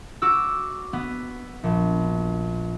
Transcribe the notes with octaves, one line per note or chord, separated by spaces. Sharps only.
F#4 D6 E6
B3
A#1